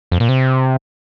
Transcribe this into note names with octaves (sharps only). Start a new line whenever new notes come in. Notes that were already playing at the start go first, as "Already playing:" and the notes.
F2
A#2
C3